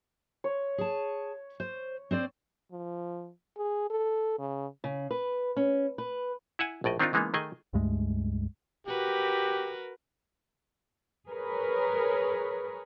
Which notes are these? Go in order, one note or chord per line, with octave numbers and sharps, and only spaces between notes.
C#5
G#4 A5
C5
C4 C5 D5
F3
G#4
A4
C#3
C#3
B4
C#4
B4
E4 E5 F#5 G#5
A#1 A2 D5 D#5
D#3 C4 D4 D#4 F4
C#3 E3 G#3 A#3 B3 D#4
D#3 A3 G#4 D#5 G#5
C#2 G2 G#3 A3
F#4 G4 A#4 B4
G#4 A#4 B4 C#5